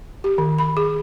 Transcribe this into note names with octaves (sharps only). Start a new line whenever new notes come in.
G4
D#3
B5
G#4